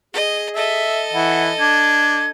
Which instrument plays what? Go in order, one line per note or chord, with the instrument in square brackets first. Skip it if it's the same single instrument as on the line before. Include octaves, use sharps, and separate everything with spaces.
[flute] G#4 [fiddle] D#5
[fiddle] A4 D#5 [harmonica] E5
[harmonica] E3 E4 [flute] F#5
[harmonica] D4 [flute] G#6